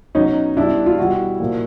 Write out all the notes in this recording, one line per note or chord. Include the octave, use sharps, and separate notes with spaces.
B2 F#3 C#4 D#4
B2 G3 D4 E4
F4
B2 G3 E4 F#4
A#2 F3